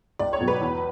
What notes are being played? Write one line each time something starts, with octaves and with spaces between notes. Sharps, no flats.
C#2 D5
C#5
B2 F#3
B4
E2